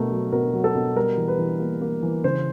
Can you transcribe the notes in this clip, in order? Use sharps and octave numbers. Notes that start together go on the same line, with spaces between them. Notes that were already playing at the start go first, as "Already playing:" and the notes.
Already playing: B2 A3 A#4
F#3
B2 A#4
F#3
A4
B2
G3 A#4
E3
B4
E3
A#3
A#3
E3
C#3 C5